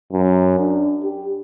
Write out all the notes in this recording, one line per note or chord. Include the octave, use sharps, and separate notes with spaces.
F#2
D4
G4